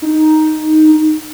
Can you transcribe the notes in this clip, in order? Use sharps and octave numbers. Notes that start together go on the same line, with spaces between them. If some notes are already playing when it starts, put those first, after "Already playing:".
D#4